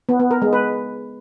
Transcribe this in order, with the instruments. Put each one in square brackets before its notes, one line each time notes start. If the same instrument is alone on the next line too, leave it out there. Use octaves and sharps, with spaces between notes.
[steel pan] B3
B3
A#4
G#3
B4